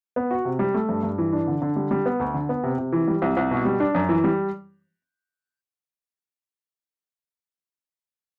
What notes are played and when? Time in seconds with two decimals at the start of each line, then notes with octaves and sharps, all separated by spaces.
0.16 B3
0.31 F#4
0.45 C3
0.59 G3
0.74 A3
0.89 G2
1.03 G2
1.18 E3
1.33 D4
1.48 D3
1.62 D3
1.76 G3
1.91 G3
2.06 B3
2.20 D2
2.34 D3
2.49 B3
2.63 C3
2.78 C3
2.93 E3
3.08 G3
3.22 C2
3.37 C2
3.51 B2
3.65 G3
3.80 D4
3.95 F#2
4.09 E3
4.24 G3